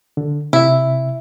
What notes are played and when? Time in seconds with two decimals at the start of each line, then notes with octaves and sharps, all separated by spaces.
0.17 D3
0.53 C3 E4 E5